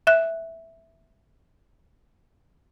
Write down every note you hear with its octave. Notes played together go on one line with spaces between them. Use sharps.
E5 F#6